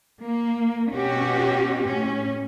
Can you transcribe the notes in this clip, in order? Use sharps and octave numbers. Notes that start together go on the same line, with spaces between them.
A#3
B2 C#4 F#4 G4
A2 C#4